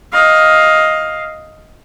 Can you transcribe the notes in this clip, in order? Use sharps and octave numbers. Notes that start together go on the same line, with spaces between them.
D#5 F5